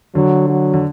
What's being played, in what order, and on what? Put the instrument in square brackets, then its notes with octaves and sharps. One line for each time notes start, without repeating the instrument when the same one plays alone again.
[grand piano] D3 [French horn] F#3
[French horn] F#3
[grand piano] D3